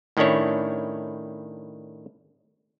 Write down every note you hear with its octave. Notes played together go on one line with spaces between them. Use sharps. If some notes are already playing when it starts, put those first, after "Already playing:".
A2 D#3 C#4 D4 E4 C#5